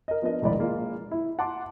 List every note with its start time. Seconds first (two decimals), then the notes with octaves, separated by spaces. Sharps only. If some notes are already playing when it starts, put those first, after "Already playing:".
0.08 A#4 D#5
0.22 F3 B3 D4 A#4 D#5
0.42 E1 A#1 G#2 D#3 D5 B5
0.58 G#3 A#3 F4
1.11 E4
1.39 F#5 A5 C6 D6